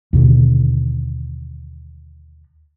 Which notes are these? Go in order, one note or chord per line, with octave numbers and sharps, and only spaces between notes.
D#2 B2 D3